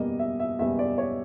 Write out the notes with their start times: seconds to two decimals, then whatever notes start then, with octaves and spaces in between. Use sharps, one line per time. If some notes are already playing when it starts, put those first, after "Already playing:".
Already playing: F#1 E2 B2 G3 A#3 D#5
0.19 E5
0.40 E5
0.59 F#1 E2 B2 G3 A#3 E5
0.79 D5
0.98 C#5